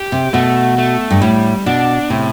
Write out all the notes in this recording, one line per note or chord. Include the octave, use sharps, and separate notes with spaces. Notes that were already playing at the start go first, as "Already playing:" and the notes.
Already playing: G4
C3
B2 A3
A3
G2
A2 G3
B2 D4
A2 C3